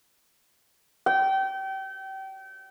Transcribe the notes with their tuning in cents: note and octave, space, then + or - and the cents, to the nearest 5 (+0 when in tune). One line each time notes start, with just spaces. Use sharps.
G5 -30